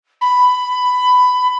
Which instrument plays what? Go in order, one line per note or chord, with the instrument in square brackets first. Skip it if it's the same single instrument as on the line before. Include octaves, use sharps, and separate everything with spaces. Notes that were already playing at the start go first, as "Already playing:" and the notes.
[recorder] B5